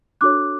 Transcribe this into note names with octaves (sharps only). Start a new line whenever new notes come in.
D4 F#4 A4 C#5 D6 F#6